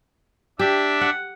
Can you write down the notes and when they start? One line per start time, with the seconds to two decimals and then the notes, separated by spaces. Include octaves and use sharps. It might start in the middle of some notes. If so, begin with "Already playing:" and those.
0.59 D4 G4 E5
1.01 F#5